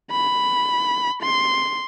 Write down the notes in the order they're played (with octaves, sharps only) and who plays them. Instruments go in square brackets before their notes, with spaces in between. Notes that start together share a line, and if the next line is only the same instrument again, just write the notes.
[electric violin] B5
C6